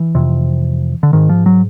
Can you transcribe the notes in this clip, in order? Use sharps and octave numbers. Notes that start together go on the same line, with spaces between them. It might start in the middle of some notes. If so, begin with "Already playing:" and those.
Already playing: E3
F2 C3
D3
G#2 D#3
F3
F#3